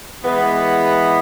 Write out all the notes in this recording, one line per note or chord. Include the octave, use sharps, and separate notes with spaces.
E3 G#3 B3